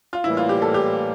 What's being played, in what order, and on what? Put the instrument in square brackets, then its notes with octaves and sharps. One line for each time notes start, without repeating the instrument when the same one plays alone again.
[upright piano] F4
[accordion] A2 E3 G3 A#3 [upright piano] E4
[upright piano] F4
G4
A4
G4